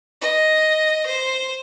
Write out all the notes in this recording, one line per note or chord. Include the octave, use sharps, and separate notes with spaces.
D#5
C5